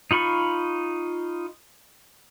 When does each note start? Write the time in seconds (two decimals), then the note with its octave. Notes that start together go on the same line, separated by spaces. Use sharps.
0.11 D#4 F4 B5 C#6